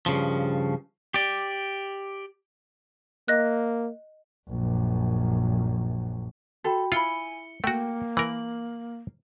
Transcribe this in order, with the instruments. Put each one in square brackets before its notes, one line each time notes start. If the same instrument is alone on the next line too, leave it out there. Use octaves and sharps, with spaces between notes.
[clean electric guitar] G2 C#3 F3
G4 D5
[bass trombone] A#3 [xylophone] D#5 F#6
[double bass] A#1 F#2
[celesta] F#4 G5 B5 [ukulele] A4
[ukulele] E4 B5 [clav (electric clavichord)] F4 [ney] G#5 [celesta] C#7 G7
[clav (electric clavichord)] A3 F#4 [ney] A#3 [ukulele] G5
[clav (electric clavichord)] E3 A#4 [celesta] F#7